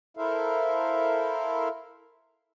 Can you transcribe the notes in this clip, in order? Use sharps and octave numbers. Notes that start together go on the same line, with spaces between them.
E4 A4 A#4 C5 E5 F5